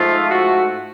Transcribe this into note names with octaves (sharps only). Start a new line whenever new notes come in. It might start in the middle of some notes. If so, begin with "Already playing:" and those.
Already playing: G#2 F3 A3 F4
F#4